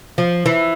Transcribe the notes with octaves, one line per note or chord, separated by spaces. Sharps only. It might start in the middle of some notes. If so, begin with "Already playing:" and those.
F3
E3